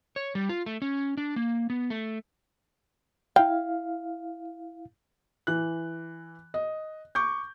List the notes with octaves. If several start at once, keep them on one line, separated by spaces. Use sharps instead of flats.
C#5
G3
F4
A3
C#4
D4
A#3
B3
A3
E4 F5 G5
E3 F#6
D#5
C#6 D6 G6